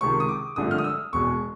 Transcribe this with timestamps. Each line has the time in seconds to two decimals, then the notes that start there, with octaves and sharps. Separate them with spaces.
0.01 C#2 C3 D#3 C#6
0.20 D#6
0.29 D6
0.56 G#1 G2 D3 F3 A3 D#6
0.71 F6
0.78 D#6
0.84 E6
1.13 E1 E2 B2 G#3 C#6